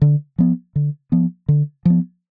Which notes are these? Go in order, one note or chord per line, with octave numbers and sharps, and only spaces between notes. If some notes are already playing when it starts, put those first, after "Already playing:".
D3
F3 B3
D3
F3 B3
D3
F3 B3